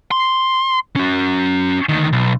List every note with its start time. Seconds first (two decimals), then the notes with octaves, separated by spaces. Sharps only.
0.11 C6
0.96 C#4 F#4
1.89 D2 D#3
2.13 B1